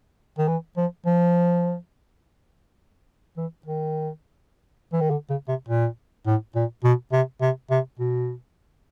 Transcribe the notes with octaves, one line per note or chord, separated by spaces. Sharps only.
D#3
E3
F3
F3
E3
D#3
E3
D#3
D3
C#3
C3
A#2
A2
A#2
B2
C3
C3
C3
B2